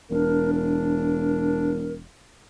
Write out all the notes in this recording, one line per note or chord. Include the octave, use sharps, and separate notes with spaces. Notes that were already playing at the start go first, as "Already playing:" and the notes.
E1 D4 A#4
A#4